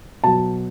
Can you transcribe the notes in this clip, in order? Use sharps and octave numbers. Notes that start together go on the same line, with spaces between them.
B2 F#3 A5